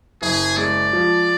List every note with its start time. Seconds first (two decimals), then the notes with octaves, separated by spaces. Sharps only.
0.22 F#1 G#4
0.57 G#3 D5
0.93 F3